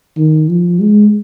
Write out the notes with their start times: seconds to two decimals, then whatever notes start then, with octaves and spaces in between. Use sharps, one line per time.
0.18 D#3
0.49 F3
0.80 G#3